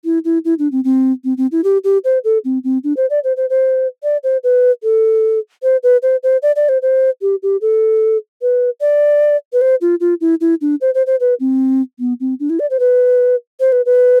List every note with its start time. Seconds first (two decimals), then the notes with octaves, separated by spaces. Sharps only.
0.05 E4
0.25 E4
0.45 E4
0.59 D4
0.72 C4
0.84 C4
1.24 C4
1.38 C4
1.52 E4
1.64 G4
1.84 G4
2.04 C5
2.24 A4
2.45 C4
2.64 C4
2.84 D4
2.97 C5
3.10 D5
3.24 C5
3.37 C5
3.50 C5
4.03 D5
4.24 C5
4.44 B4
4.83 A4
5.63 C5
5.83 B4
6.02 C5
6.23 C5
6.42 D5
6.56 D5
6.69 C5
6.82 C5
7.22 G4
7.43 G4
7.61 A4
8.42 B4
8.81 D5
9.53 B4
9.61 C5
9.81 F4
10.00 F4
10.21 E4
10.41 E4
10.61 D4
10.81 C5
10.95 C5
11.07 C5
11.20 B4
11.40 C4
12.00 B3
12.20 C4
12.40 D4
12.50 E4
12.60 D5
12.70 C5
12.80 B4
13.60 C5
13.72 B4
13.86 B4